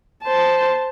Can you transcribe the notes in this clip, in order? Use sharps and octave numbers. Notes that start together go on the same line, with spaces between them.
C5 A5